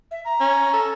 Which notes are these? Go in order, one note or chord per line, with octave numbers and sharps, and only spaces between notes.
E5
A#5
C#4
A4